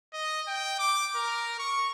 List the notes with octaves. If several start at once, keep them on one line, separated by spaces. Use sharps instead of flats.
D#5
G5
D6
A#4
C#6